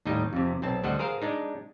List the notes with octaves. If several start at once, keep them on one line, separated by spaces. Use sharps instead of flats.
D#2 A2 G3 D#4 D#5
F2 C3
B1 C4 A5
D2 G3 A4 C5 D#5 F#5
G#4 A#4 C5 F5
G#3 D4 D#4